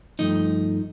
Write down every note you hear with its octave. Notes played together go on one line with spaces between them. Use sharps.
G2 D3 F3 A3 D#4 D#5